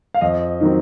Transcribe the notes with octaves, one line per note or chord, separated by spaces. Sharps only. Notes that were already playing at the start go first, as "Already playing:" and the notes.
F5
F2 D#5
D#3 F#3 C4